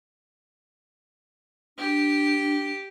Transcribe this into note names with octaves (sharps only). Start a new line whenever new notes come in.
D4 G4